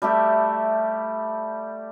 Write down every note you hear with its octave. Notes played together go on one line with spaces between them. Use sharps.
G3 A3 G4 E5